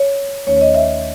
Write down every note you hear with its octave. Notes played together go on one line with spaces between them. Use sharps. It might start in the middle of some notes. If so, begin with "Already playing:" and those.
Already playing: C#5
D#2 D#3 A3 C#4 C#5
C#5
D#5
E5